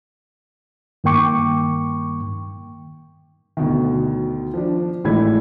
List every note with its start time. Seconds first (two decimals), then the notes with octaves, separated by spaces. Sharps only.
1.04 G2 D#3 A#3 G5 C#6 D6
3.57 D2 B2 D#3
4.54 F3 D4
5.04 G#1 A2 E3 G#3 B5 G#6